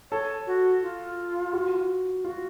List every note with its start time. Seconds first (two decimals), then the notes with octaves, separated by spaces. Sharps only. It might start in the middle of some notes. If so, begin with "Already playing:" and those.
0.11 A4 C#5
0.47 F#4
0.82 F4
1.53 F#4
2.24 F4 F#4